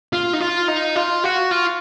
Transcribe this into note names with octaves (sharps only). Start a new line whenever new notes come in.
F4
D#4
F4
D#4
F4
F#4
F4